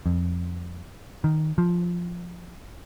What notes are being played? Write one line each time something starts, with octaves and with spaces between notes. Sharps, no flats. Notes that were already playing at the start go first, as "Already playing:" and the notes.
F2
D#3
F3